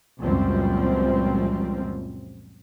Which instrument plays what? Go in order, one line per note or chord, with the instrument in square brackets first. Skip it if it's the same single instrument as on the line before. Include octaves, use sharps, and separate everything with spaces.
[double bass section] C#2 F#2 A#2 F3 G3 C4